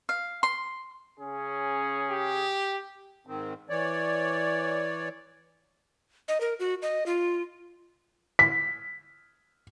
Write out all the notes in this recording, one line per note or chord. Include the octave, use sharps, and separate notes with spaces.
F5
C6
C#3 C#4 G#4
G4
G#2 D#3 C4
E3 C#5 D5
D#5
A#4
F#4
D#5
F4
B6